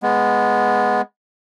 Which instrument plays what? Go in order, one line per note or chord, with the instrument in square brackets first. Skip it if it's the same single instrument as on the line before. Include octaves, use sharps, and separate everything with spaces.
[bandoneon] G#3 B3